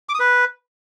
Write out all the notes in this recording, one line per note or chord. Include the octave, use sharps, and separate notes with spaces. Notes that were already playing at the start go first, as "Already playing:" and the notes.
D6
D#6
B4